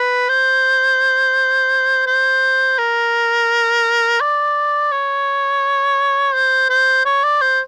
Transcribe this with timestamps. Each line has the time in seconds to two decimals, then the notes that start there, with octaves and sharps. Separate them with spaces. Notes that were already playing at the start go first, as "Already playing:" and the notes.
Already playing: B4
0.29 C5
2.07 C5
2.78 A#4
4.21 D5
4.92 C#5
6.34 C5
6.70 C5
7.05 C#5
7.24 D5
7.41 C5